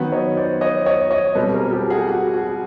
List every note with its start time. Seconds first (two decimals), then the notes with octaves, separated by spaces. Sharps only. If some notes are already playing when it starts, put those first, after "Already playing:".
Already playing: D#3 F#3 B3
0.12 C#5 D#5
0.37 C5 D5
0.61 C#5 D#5
0.86 C#5 D#5
1.11 C#5 D#5
1.35 B2 G3 C4 A4 B4
1.54 G#4 A#4
1.72 G4 A4
1.90 F#4 G#4
2.09 F#4
2.34 F#4